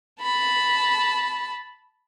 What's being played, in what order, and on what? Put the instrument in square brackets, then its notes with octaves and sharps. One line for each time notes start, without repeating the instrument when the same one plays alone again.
[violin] A5 B5